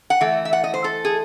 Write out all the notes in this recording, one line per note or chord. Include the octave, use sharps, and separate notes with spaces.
F#5
E3 A3
E5
F#5
D#5
C5
A4
G#4